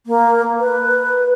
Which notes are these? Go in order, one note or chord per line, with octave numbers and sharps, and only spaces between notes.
A#3
B4